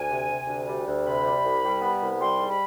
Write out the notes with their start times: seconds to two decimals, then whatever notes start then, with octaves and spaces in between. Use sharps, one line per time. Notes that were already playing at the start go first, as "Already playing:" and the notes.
Already playing: D2 G#5
0.09 C3
0.28 C3
0.47 D2
0.67 G3
0.86 D2
1.05 C3 B5
1.24 G3
1.43 C2
1.63 G3
1.82 B3
2.01 C2
2.20 G3 C6
2.39 G#2
2.49 B5